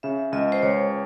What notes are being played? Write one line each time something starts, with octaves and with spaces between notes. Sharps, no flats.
C#3 E5
C#2 D#5
C5
C#2 C#5